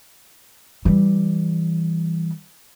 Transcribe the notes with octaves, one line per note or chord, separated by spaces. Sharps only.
E3 G3